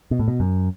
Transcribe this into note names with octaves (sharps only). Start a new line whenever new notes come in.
B2
A2
B2
F#2